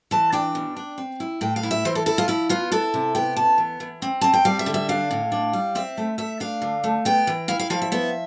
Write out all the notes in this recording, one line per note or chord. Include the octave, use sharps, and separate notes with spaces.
E3 A5
D4 G5
B2
D4
C4
E4
A2 G5
F5
E4
E5
E3 C5
A4
E4 A4
F4
F3 E4
B3 F4
E4 A4
C3
B3 G5
B3 A5
E3
E3
C4
C4 A5
G5
G3 F5
E5
D3
E5
D4 F5
A2
D4
G3
C4 E5
A3
A3 E5
D4 F5
D3
A3
B3 G5
E3
E4 F5
F5
F3 F5
E5
B3 E5